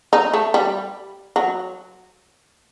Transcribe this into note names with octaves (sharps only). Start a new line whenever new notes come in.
D#4
A3
G3
F#3